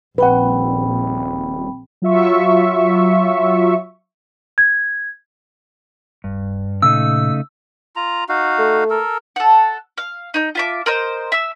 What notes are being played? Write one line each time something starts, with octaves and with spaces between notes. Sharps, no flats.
D#1 A#1 C4 B4 F#5 G5 B5
F#3 F4 E5 C#6
G#6
D1 G2
A#2 C#3 A3 D#4 E6
F4 A#5
D#4 F#4 F5
A3
A4 A#4
A4 F#5
F5
D#4 G6
F4 E5 D6
A#4 C5 D#5
E5 E6